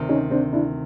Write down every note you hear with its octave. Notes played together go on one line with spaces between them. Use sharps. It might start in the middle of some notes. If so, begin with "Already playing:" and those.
Already playing: D2 C3 D#3
C#4 D#4
C4 D4
D4 E4